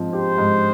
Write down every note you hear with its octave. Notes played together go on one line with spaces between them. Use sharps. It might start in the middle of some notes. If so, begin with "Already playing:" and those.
Already playing: G#2 F3 C4
G4 C5
G#2